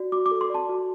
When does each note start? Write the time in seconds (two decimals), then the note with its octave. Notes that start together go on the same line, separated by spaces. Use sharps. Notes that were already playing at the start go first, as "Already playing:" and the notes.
Already playing: F#4 D5
0.12 F#4 D6
0.26 D6
0.31 A4
0.41 C6
0.50 D5 A5
0.69 F#4